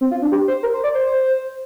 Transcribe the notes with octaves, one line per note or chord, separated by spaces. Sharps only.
C4
F4
D4
G4
C5
A#4
C5
D5
C5